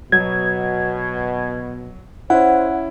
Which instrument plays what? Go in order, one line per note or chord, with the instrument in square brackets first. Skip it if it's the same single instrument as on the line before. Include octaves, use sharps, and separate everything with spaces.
[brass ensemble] B2 [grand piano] F#3 [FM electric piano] G#6
[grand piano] C#4 E4 [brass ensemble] C5 [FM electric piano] F#5